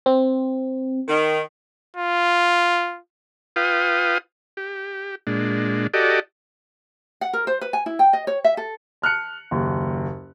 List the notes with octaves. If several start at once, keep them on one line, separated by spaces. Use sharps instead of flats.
C4
D#3
F4
F4 B4 F5 G5 D#6
G4
A#2 G#3 D4
F#4 G4 A4 D5 D#5
F#5
A#4
C5
B4
G#5
E4
G5
D#5
C#5
E5
A4
A5 F6 F#6 C#7
F#1 D#2